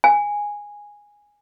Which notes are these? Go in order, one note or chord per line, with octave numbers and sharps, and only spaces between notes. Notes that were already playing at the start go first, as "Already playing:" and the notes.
G#5